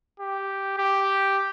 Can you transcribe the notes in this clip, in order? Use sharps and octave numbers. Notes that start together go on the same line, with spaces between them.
G4
G4